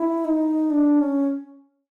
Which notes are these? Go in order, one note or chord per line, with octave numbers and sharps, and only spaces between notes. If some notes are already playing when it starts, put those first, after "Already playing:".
Already playing: E4
D#4
D4
C#4